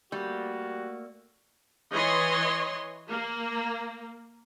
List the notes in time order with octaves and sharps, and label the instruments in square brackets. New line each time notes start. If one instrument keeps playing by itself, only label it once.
[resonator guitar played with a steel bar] G3 [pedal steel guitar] A3 A#3 [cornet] F#4
[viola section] E3 C#5 D#5 C6
A#3